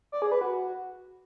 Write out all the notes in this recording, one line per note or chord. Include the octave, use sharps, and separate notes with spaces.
D5
G#4
B4
F#4